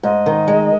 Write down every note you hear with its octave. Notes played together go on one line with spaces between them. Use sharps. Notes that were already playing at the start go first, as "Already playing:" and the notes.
G#2 D#5
D#3
G#3